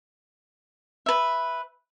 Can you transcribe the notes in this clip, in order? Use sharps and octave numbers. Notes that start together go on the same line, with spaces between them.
B4 E5